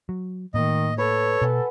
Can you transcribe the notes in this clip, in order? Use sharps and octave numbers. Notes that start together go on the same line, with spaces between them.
F#3
A2 D#3 A#3 D#5
A4 B4 C#5
B2 F#5 G#5 C#6